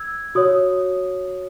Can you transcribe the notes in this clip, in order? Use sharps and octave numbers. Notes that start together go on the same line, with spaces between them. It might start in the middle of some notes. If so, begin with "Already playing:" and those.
Already playing: E6 G#6
F#4 C#5 D#6